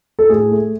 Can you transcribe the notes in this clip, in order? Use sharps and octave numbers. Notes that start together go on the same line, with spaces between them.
A4
A2 G#4
A3